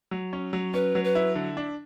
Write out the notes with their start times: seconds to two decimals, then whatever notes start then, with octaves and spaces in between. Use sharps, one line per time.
0.11 F#3
0.33 C#4
0.53 F#3
0.74 C#4 B4
0.95 F#3
1.04 B4
1.15 E4
1.35 D3
1.57 D4